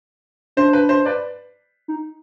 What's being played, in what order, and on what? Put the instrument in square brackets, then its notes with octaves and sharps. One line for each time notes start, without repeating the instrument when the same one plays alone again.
[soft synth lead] D4 [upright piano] C5
[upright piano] B4
C5
B4 D5
[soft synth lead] D#4